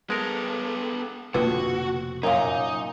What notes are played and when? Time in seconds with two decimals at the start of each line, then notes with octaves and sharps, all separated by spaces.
0.10 G#3 B3 A4 A#4
1.34 F1 F2 B2 D3 A#3 F4 F#4 B4
2.23 F#2 A#2 D#4 A#4 C#5 F5